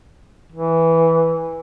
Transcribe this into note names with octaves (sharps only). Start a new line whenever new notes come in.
E3